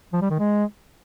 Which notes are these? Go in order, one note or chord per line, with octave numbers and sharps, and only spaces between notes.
F3
G3
D#3
G#3